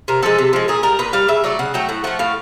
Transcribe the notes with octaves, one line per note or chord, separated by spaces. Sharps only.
C3 A#4
F3 G#3 A4
C3
F3 G#3
A#2 G#4
G3 A#4
A#2 B4
G3 F5
C#3 E5
F#3 A3 D5
C#3 F#5
F#3 A3 G5
A2 F#5
F3 A3 F#5
A2 F5